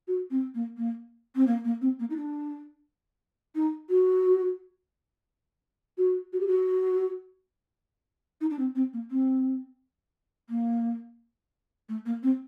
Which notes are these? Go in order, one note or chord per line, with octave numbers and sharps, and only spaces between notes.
F#4
C4
A#3
A#3
C4
A#3
A#3
C4
A#3
D#4
D4
D#4
F#4
F#4
F#4
G4
F#4
D#4
D4
C4
C4
A#3
C4
A#3
A3
A#3
C4